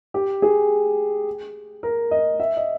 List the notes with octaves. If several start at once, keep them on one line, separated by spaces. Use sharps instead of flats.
G4
G#4
A#4
D#5
E5
D#5